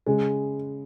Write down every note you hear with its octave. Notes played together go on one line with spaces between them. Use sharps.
C#3 G#3